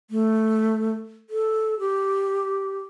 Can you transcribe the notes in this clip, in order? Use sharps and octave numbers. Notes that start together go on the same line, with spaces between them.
A3
A4
G4